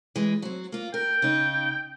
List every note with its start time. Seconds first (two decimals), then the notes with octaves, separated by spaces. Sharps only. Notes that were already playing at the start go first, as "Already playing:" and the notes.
0.16 E3 G#3
0.42 F#3 C4
0.72 A#3 F4
0.94 A#4 G5
1.22 C#3 D#4